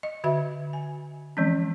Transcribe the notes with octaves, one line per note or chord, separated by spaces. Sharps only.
D#5
D3 F#4 E5
G#5
E3 F3 G#3 C4 C#4